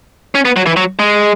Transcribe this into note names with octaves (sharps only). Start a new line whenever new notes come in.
C#4
B3
F#3
E3
F#3
G#3